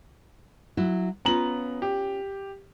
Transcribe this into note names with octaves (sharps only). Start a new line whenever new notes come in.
F#3 E4 F#4
B3 C#4 F4 A#5 F#7
G4